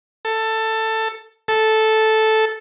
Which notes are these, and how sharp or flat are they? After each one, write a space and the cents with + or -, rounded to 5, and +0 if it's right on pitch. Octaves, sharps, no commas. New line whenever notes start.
A4 +15
A4 -5